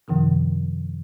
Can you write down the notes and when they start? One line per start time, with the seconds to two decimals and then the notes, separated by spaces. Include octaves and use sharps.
0.08 F#2 C3 D#3 F3